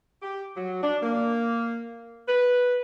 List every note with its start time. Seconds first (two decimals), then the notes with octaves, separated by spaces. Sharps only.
0.22 G4
0.57 F#3
0.83 D4
1.02 A#3
2.28 B4